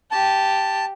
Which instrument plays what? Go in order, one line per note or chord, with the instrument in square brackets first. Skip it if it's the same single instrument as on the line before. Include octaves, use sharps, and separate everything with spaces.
[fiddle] G4 [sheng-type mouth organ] A5